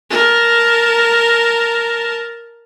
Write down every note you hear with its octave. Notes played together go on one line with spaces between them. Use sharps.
A#4 A5